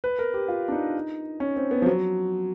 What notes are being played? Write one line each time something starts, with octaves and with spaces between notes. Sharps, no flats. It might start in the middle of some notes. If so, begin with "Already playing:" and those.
B4
A#4
G4
F4
D4
D#4
C#4
C4
B3
F3
F#3